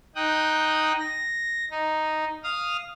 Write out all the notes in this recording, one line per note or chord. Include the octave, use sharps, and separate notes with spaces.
D#4 G5 D#6 F#6
A#6
D#4
F5 D#6 F6